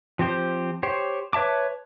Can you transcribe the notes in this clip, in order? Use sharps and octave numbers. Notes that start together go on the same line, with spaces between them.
F3 C4 G4 C5
G4 C5 C#5
B4 C#5 E5 A5 D6